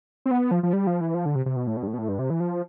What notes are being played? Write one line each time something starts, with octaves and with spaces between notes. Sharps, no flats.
C4
B3
F3
F3
G3
F3
E3
F3
D3
C3
C3
B2
A2
B2
G2
A2
B2
A2
G2
C3
E3
F3